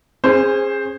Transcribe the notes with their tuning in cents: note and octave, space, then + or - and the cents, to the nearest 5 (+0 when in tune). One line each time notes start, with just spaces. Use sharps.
C#4 -30 G#4 -10 C5 +0